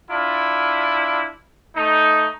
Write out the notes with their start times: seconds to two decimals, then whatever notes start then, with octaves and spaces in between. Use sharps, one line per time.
0.11 D4 E4 F4
1.77 A3 D#4